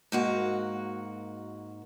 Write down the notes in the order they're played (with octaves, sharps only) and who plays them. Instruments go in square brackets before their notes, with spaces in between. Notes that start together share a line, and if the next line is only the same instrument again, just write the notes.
[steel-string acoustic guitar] G#2 A#3 F#4